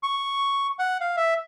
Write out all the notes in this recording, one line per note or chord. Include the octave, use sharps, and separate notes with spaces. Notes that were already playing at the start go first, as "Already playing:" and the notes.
C#6
F#5
F5
E5